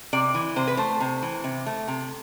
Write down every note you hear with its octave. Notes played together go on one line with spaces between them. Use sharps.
C3 D5
E3
C3 C5
B4
A3 C5
C3
E3
C3
A3
C3